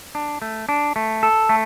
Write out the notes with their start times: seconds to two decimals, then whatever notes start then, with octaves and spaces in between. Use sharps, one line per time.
0.15 D4
0.42 A3
0.69 D4
0.96 A3
1.23 A4
1.49 A3